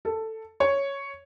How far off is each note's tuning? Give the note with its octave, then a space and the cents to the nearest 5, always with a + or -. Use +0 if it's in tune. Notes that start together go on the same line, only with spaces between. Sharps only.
A4 +10
C#5 +0